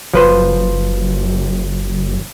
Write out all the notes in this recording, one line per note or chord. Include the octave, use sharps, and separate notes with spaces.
F#1 F3 B4 C5